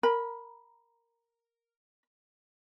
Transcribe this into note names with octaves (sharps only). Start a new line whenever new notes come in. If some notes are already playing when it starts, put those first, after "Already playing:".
A#4 B5